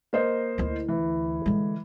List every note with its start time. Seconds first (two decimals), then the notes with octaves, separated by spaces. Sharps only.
0.13 A#3 C5 D#5
0.58 D2 E4
0.88 E3
1.46 D3 G#3